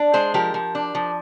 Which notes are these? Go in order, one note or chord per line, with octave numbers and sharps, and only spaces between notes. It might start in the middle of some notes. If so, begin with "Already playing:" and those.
Already playing: D4
G#3 G#4 C5
F3 G4 A#4
F3
D4
F3